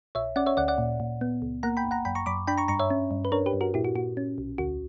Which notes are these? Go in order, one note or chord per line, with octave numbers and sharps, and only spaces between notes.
A#1 C#5 E5
C#4 D5 F#5
C#5 E5
D2 D5 F#5
D5 F#5
A#2
A#2
B3
C#2
A#3 F#5 A#5
G5 B5
G1
F#5 A#5
F#2 G5 B5
A#5 C#6
F#2 B5 D6
D4 G5 B5
A#5 C#6
G2 A#5 C#6
C#5 E5
C#4
G2
B4
D4 A#4 C#5
G4 B4
G2
F#4 A#4
A#2 E4 G4
F#4
A#2 F#4
C#4
B1
D2 F#4